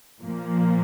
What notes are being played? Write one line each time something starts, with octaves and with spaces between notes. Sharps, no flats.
A#2 F3 A#3